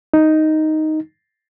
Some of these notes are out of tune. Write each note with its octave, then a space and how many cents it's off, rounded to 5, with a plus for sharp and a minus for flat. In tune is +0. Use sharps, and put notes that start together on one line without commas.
D#4 +5